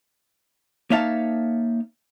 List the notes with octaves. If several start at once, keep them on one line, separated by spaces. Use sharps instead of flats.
A#3 D#4 C#5 E5 F5 A5